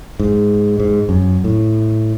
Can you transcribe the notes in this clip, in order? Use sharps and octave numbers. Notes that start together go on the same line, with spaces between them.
G#2
G#2
F#2
A2